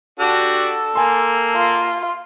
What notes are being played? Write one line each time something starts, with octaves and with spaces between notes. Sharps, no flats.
D4 F#4 G4 A4
A#3 G#5 A5 C6
F4